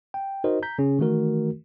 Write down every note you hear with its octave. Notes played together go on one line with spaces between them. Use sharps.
G5
D#4 F#4 A#4 C5 D#5
A#5 G6 B6
C#3 C#4 G#4
D#3 E3 A3 F#4 A#4